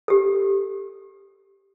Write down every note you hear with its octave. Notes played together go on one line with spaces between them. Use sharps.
G4 A4